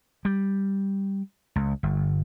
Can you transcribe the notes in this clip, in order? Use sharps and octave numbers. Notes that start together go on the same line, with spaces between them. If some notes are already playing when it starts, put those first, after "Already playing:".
G3
C#2
G1